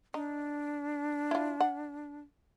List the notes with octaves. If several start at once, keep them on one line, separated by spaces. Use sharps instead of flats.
D4 D#4
E4 F4
F#5